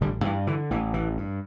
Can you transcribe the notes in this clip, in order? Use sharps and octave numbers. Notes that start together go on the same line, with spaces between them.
A1 D3 G3
G2 E3
D3 E3
A1 E3
A1 E3
G2